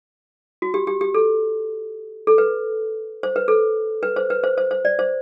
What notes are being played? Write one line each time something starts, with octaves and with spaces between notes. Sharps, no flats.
F#4
G4
G4
G4
A4
A4
B4
C5
B4
A4
B4
C5
B4
C5
C5
C5
D5
C5